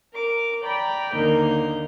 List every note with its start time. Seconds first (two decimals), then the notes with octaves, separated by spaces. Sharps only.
0.13 A#4 D6
0.64 D5 G5 A#5 B5
1.14 D#2 D3 A#3 D#4 A#4 G6